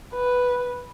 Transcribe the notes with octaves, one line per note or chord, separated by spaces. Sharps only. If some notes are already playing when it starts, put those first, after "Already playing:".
B4